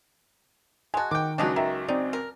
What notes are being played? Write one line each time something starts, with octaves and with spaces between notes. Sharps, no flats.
G#3 F#4 G#5 A5
D#3 G5 D6
C#2 F#3 D4 D#4 F#4
D#3 E5 A#5
C4 D#4 D5
A#4